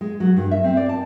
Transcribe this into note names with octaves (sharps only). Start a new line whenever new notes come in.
G#3
F#3
G2
E5
C4
D5
A5